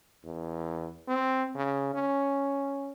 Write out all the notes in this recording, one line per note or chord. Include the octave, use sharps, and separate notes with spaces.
E2
C4
C#3
C#4